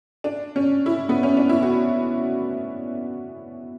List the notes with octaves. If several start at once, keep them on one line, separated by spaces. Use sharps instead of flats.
D4
C#4
E4
B3
C#4
D4
E4
F#4